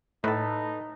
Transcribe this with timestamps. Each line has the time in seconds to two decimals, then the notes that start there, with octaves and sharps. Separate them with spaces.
0.24 A2 D#4 A4 B4